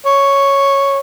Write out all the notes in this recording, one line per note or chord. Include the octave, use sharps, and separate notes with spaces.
C#5